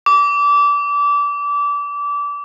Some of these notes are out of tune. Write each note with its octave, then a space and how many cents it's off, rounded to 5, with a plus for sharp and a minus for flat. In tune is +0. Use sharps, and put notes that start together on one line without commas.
D6 -25